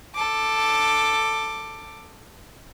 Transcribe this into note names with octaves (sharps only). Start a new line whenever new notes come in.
A4 D6